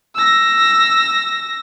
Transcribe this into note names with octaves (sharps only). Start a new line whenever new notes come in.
E6 A#6